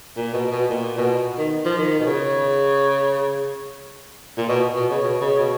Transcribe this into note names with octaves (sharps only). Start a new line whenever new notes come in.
A#2
B2
B2
A#2
B2
D#3
F3
D#3
B2
C#3
A#2
B2
B2
C#3
B2
C#3
B2